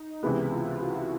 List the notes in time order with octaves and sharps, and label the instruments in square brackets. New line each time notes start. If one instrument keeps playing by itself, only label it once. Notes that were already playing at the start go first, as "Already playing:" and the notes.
Already playing: [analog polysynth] D#4
[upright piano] C#2 C3 E3 G#3 B3 [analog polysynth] E4
[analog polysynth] F4
F#4